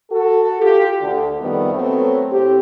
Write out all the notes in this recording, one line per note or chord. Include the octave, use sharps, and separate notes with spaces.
F#4 A4
F4 G4
D2 D3
F2 D#3 G3 A3 B3
F#3 A3 B3 C4
A2 C4 G4